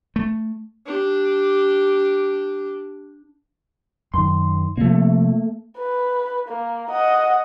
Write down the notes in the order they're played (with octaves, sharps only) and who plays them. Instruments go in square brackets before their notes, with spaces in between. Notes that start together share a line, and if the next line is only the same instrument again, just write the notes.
[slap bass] A3
[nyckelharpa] D4 G4
[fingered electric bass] F#2 D#3 [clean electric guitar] C6
[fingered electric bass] C3 F3 [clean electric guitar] A3 A#3
[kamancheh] B4
A#3
D#5 F#5